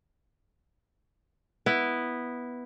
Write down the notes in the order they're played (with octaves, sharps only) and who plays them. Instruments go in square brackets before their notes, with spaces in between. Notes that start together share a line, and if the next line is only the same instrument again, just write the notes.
[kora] B3 E4